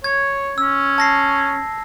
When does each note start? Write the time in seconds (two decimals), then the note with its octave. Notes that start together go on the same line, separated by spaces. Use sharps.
0.04 C#5 G#6
0.58 C#4 E6
0.98 A5 A#6 C7